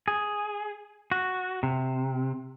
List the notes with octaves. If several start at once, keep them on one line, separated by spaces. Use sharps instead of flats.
G#4
F#4
C3